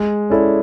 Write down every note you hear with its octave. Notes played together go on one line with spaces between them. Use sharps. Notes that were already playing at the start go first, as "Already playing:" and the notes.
Already playing: G#3
C#4 E4 A4 D5